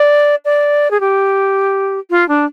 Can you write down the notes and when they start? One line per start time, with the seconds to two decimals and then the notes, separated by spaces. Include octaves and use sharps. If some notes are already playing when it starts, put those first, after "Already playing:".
Already playing: D5
0.45 D5
0.91 G#4
1.00 G4
2.10 F4
2.29 D4